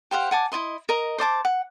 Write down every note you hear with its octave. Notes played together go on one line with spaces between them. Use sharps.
G4 C5 F5 F#5
F#5 G#5 A5 D6
E4 C#5 D#5 C6
A#4 D#5 A#5
C5 D5 A5 D6
F#5